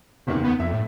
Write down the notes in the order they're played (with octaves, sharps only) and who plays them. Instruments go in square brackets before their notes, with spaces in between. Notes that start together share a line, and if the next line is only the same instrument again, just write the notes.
[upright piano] F#1 E2 D#3 [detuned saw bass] C3
[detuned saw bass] B3
[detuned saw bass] F2 [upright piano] E5
[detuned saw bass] A2